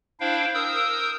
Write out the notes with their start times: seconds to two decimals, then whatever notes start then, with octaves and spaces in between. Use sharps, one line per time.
0.20 D4 E4 C5 F5 G5
0.54 A#4 D#6 E6 G6